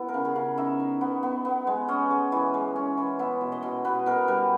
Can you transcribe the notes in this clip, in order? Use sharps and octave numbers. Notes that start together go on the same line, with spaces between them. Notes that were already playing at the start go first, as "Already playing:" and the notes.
Already playing: B3 E4
A#4
C#3
G#4
C#3
D#4 E5
D#4
B3
B3
B3
G#3
C#4 D#5
G#3
E3
G#3
C#4
E3
B3 E5
B2
D#5
B2
B2 B4
B2 A#4
G3 B4